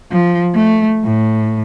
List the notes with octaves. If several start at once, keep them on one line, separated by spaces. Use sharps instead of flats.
F3
A3
A2